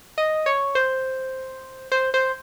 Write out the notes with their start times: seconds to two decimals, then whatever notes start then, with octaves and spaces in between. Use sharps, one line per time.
0.18 D#5
0.46 C#5
0.75 C5
1.92 C5
2.14 C5